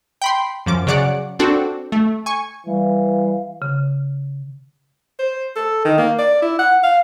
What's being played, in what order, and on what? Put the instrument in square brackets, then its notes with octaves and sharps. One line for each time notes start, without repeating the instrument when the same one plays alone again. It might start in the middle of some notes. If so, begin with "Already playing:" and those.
[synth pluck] G5 B5 C6
F#2 F3 D6
C#3 F#3 D5 F#5 D6
C4 D4 F#4 A4
A3
G#5 C#6
[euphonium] E3 [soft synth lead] G3 [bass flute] F5
[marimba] C#3
[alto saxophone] C5
A4
D#3
A#3
D5
E4
F#5
F5